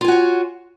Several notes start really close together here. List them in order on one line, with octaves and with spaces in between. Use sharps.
F4 G#5 F#4 C#5